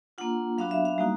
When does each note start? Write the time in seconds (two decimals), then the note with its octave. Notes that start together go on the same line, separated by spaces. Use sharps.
0.18 A#3 D4 F4 F#5
0.58 F#3 B3 D4 F#4 F5
0.71 E5
0.85 F5
0.98 G3 A#3 D#4 F#4